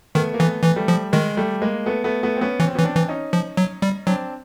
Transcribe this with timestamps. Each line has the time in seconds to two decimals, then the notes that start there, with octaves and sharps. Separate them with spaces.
0.15 D#3 A3 B3
0.34 A#3
0.39 E3 A3 B3
0.64 E3
0.76 G3 A3
0.88 F3
1.13 D#3 G#3
1.37 G3 A3
1.62 G#3 A#3
1.86 A3 B3
2.04 A3 B3
2.23 A3 B3
2.37 C4
2.41 B3 C#4
2.60 E3 C#4
2.67 C4
2.75 E3 B3 C#4
2.84 C4 D4
2.96 E3
3.09 C#4 D#4
3.33 F3
3.57 F#3
3.82 G3
4.07 F#3 C4 D4